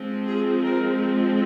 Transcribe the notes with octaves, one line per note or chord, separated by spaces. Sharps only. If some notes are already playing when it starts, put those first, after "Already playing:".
Already playing: F3 G#3 C4
G#4
A#4